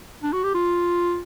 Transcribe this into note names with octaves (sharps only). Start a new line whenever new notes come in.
D4
F#4
G4
F4